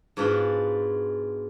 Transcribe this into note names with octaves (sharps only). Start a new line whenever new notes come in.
G#2 B2 D4 F4 B4